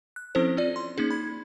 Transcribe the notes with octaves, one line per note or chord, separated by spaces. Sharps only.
F#6
F3 C4 C#4 E4 A4 C5
C4 F4 D5
C6
A#3 C#4 D#4 G#4
B5 G#6